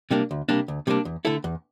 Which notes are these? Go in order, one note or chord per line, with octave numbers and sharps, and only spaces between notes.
C3 G3 A#3 D4
D2
C3 G3 A#3 D4
D2
C3 G3 A#3 D4
E2
D3 A3 E4 A4
E2